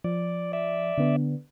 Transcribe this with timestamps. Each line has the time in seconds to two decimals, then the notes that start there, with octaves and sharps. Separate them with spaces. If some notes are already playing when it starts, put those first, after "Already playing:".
0.04 F3 D5
0.53 D5 E5
0.98 D3 B3 D4